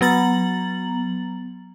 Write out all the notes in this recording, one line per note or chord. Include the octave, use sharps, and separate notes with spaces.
F#3 B3 A#5 A6 F#7